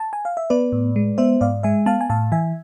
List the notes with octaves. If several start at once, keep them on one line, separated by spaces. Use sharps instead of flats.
A5
G#5
F5
E5
B3 B4 D5
A2
G#3
B3 C5 E5
G#2 D5 F5
G#3 E5 G#5
B3 F5 A5
G#5
A2 F5 A5
E3 E5 G#5